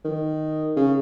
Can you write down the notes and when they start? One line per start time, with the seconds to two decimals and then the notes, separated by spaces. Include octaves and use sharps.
0.04 D#3
0.76 C#3